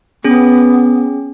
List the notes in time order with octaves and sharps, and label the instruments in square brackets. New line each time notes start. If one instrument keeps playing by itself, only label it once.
[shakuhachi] B3 [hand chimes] C#4 G#4